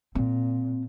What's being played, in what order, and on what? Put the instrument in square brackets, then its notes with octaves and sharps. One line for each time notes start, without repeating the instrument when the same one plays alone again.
[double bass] A#2 [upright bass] C4